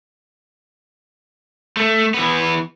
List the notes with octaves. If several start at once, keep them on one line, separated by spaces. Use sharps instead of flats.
A3
E3 B3